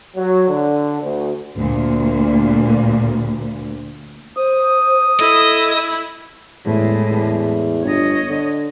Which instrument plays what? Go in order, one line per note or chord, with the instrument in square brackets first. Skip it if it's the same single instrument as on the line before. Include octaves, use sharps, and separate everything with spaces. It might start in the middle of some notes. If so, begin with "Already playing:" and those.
[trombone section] F#3
D3
D2
[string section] D2 A#2
[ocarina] C5 [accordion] D#6
[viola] E4 [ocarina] A4 [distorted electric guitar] D#5
[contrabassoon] E2 [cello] A2 G#3
[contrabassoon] E2
[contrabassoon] G1 [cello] C#5 D#5
[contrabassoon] D3